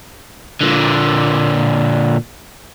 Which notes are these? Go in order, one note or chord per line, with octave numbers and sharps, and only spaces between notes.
A#2 D3